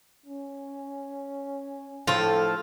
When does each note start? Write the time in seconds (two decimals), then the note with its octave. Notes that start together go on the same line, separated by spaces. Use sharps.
0.26 C#4
2.07 A2 F3 F4 A4